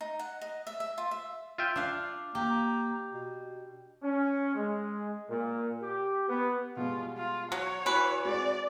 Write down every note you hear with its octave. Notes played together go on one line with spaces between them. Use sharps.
D#4
F#5
D#5
E5
E5
F4
E5
F4 E5 G5
D4 F5
A#3 G4
B2
C#4
G#3
A#2
G4
B3
B2 G3 G#3 F4
F4
F#3 C#5
E3 F#4 B4
G#3 C4 F#4 D5